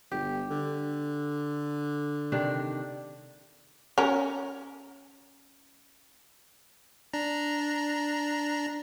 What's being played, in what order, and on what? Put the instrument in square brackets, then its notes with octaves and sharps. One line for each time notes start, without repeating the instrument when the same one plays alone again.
[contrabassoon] G1 [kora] G4
[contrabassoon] D3
[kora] C3 D#3 D4
[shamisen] C#4 A#4
[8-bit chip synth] D4 A#5